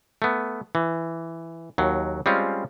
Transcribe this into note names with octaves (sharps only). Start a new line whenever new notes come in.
A3 B3
E3
D#2 F#3
G3 G#3 C4 C#4 F4